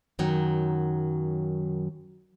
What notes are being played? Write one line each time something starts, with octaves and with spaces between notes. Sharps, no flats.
F#2 D#3 F#3